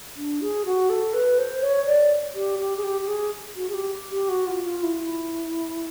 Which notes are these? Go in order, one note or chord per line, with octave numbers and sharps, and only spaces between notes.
D4
G#4
F#4
A4
B4
C5
C#5
D5
G4
G4
G#4
G4
G4
G#4
F#4
G#4
G4
G4
F#4
F4
F4
E4